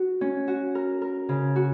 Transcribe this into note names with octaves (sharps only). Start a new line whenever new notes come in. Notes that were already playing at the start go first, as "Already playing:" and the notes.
Already playing: F#4
C#4
F#4
A#4
A#4
C#3
F#4